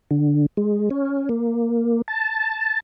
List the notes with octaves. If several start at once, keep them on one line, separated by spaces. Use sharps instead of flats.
D3
G#3
C#4
A#3
A5